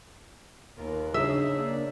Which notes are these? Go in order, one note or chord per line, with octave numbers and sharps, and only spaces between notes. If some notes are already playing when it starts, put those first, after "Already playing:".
D#2 B3 F4 A#4
C#3 D4 D#4 G#4 E5
A#2 A#3 D4